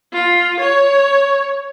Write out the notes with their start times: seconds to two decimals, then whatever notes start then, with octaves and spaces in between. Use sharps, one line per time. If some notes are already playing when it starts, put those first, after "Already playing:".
0.13 F4
0.60 C#5